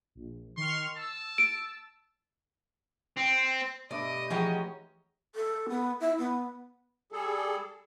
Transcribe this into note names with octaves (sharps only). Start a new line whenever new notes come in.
A#1
D#3 C6 C#6 F6
A5 E6
D7
C4
G2 B2 A3 B4 D5 D#5
E3 F3 G#3 C#4 D#4 F#4 C#5 G5
A4
B3
E4
B3
G3 G#4 A4